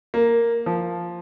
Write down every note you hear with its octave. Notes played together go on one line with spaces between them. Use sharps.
A#3
F3